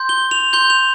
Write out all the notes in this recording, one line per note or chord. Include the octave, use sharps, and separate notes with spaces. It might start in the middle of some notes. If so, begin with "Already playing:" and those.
Already playing: C6 G6
G7
F7
C6 G6 G7
F7